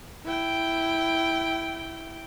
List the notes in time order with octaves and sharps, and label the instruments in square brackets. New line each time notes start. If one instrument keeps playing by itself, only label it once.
[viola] E4 G5